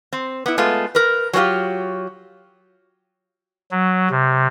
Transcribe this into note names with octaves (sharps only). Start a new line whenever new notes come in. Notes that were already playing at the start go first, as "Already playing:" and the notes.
C4
B3 E4
G#3 A3 B3 F4
A#4 B4
F#3 A#3 C4 F4 G4
F#3
C3